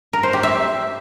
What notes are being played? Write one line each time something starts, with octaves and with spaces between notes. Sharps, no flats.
A#4
C5
G4
E5